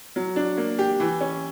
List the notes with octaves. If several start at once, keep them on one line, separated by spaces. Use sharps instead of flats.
F#3
D4
A#3
G4
E3
C#4